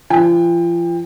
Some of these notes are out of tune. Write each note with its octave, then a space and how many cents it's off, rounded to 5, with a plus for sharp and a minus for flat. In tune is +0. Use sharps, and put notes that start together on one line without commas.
F3 -35 G5 +30